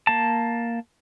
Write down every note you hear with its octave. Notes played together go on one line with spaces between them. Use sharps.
A#3 A5